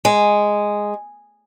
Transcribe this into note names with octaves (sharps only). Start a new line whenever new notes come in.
G#3